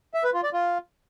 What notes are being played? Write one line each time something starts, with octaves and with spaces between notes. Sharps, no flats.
E5
B4
F4
D5
F4